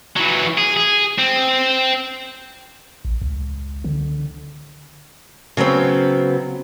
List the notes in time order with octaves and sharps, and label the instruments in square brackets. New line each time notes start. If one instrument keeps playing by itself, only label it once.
[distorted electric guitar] E3 F#3
G#4
G#4
C4
[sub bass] A1
C#2
D3
[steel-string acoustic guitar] C#3 F#3 B3 C4